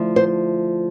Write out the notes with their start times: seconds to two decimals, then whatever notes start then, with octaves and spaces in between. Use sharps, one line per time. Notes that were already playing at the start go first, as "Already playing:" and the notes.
Already playing: D2 F3 A3 E4
0.16 C5